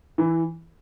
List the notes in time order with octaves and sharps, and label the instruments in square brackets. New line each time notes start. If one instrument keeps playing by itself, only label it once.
[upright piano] E3